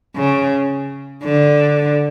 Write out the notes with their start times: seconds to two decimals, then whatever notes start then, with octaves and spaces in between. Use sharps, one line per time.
0.16 C#3
1.23 D3